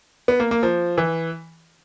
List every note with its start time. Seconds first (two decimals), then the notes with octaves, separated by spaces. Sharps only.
0.28 B3
0.40 A#3
0.51 A#3
0.63 F3
0.98 E3